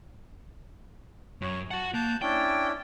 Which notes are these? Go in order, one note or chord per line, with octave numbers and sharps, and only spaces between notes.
F#2 C#5
F#4 F#5 A5
A#3 A5 F#6 G6
C#4 D4 E4 G5